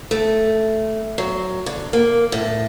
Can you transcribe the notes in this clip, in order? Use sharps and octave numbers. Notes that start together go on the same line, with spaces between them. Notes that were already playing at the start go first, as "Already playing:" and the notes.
A3
F#3
D3
A#3
A2